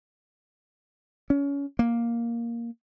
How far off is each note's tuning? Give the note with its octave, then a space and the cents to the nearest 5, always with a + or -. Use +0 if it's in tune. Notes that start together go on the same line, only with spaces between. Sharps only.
C#4 +25
A#3 +5